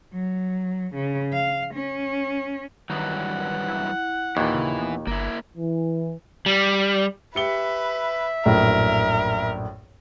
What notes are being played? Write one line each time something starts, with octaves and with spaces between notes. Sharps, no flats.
F#3
C#3
F5
C#4
G2 D#3 E3 F#3 F#5
E4
D#2 A#2 E3
C#3
B3
G1 A#3 E4
E3
G3
G4 B4 E5 C#7 G7
A#1 F#2 A2 A#4